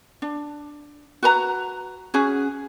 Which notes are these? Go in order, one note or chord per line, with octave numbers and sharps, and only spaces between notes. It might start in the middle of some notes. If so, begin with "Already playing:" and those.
D4
F#4 B4 A#5
C#4 F#4 G#4